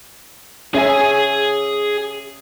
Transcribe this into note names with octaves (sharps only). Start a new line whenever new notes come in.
C#4 G#4 E5 G#5